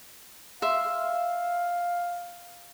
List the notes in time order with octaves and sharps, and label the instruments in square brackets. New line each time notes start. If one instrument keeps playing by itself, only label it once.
[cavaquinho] E5 C6 [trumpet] F5